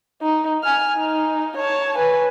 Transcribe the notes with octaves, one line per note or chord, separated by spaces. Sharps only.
D#4
G#5 F6
D#4
C#5 A5
B4 G#5